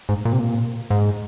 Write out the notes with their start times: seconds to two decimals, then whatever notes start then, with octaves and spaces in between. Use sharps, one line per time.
0.09 G#2
0.25 A#2
0.32 C3
0.39 A#2
0.90 G#2